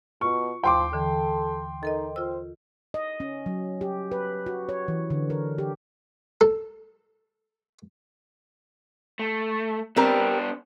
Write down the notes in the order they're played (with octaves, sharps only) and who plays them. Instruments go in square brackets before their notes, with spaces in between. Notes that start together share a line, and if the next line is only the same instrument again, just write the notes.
[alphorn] B2 [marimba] F4 [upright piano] C#6
[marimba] D#2 [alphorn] F3 [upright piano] G5 C6 D6
[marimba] D3 E3 [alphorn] A4
[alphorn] D#4 [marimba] A4 A#4 D#5
[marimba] F4 E6 [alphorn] C5
[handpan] D#5
C#4
F#3
G4
B4
F#4
C#5
E3
D3
A#4
G4
[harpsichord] A4
[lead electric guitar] A3
[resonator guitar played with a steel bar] G3 C4 A#4 [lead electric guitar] B3 D4